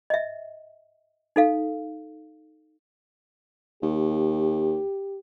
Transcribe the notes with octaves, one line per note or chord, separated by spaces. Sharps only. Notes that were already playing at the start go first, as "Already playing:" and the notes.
D#5 E5
D#4 A4 F5
D#2 G4